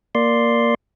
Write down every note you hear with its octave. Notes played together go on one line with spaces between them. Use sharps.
A#3 D5 C6